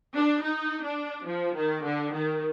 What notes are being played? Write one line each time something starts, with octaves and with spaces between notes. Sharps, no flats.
D4
D#4
D4
F3
D#3
D3
D#3